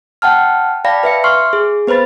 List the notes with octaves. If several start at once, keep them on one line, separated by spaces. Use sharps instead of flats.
F#5 G5 A5 F6
D5 F5 G5 A5 B5 A#6
B4 E5 C#7
C6 C#6 F6 C7
G#4
B3 B4 C5 B5 A6